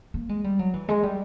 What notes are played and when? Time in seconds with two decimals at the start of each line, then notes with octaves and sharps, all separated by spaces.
0.14 A#3
0.29 G#3
0.44 G3
0.59 F#3
0.74 E3
0.89 G#3
1.03 G3